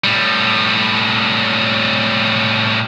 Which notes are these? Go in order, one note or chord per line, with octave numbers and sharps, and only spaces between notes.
A2 G3